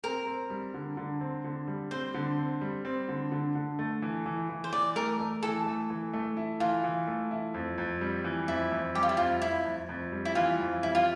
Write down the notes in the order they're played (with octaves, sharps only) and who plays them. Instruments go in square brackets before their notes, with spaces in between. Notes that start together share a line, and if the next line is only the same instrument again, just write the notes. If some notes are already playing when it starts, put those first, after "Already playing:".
[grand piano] C4 [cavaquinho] A#4
[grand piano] C4
G3
D3
D3
C4
D3
G3
[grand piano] C4 [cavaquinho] C5
[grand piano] D3
C4
G3
C4
D3
D3
D3
A3
E3
E3
E3
[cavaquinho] C5
[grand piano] E3 [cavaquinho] D5
[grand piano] A3 [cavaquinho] A#4
[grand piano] A3
[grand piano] E3 [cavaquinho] A4
[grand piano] A3
E3
A3
E4
[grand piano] E3 [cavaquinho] F4
[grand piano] E3
A3
E4
F2
F2
G3
E3
[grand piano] F2 [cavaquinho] E4
[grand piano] F2
[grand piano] G3 [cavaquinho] G4
[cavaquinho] F4
E4
[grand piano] F2 [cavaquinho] F4
[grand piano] F2 [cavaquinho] E4
[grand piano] F2
F2
G3
[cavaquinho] E4
[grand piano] E3 [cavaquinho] F4
[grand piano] F2
[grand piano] G3 [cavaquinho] E4
[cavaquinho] F4